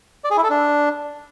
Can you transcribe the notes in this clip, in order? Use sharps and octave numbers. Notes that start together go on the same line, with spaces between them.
D5
G#4
E4
A4
D4